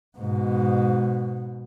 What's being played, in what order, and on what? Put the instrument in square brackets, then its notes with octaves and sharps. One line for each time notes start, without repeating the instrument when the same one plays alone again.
[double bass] G#2 B2